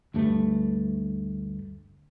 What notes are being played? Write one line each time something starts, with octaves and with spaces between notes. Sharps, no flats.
D2 G2 A3